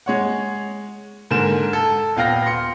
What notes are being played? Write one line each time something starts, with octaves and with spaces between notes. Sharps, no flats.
G#3 C#5 F#5
G#2 D3 A#4 E7
A4
D#1 B3 F5 G5 F6 A#6
C6 C#7